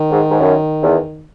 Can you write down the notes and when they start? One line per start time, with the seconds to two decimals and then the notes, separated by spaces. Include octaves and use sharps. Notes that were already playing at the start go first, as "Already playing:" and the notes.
Already playing: D#3
0.11 G#2
0.30 G#2
0.40 F#2
0.83 E2